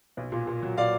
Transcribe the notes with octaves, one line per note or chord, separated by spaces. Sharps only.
B1
A#2
A#2
F#3
A#2 D5 F5